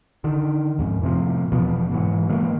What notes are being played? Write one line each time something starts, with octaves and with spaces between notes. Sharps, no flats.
D3 D#3
F2 G#2
A2 C3 F3
E1 E2 B2 F3
G#2 E3 F#3
D#3 E3 G#3 A#3